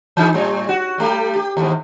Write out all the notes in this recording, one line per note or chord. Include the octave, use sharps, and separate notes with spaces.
E3 D#4 G#4
A2 G3 C#5
F#4
G3 A3 G4
G4
D#2 G#2